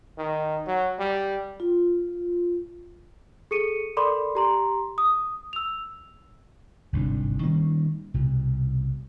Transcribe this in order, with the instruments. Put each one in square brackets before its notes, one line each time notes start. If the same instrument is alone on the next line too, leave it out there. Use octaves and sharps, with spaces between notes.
[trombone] D#3
F#3
G3
[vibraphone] F4
[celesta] G#4 A4 C#7 D#7
A4 A#4 D5 B5 C6 D6
G4 A#5 C6
D#6
E6 F7
[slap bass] G1 C2 G#2 D4
D#3 G3 A#3 C#4
C2 B2